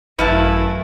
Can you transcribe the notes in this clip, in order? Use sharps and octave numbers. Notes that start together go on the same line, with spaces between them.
G#1 F#2 A3 E4 B4 F5 A5